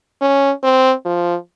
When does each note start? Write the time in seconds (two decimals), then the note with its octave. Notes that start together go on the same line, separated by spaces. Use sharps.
0.21 C#4
0.63 C4
1.06 F3